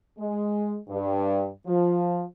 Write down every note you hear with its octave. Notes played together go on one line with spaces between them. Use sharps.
G#3
G2
F3